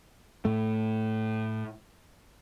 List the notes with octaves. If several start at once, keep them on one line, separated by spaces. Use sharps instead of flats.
A2 A3